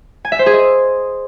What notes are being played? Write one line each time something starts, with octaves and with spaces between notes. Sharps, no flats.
G#5
E5
C5
G#4
D#5